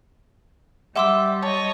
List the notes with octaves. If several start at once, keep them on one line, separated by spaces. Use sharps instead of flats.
G3 E5 F#5 C6 D6 E6
C#5 D#5 A5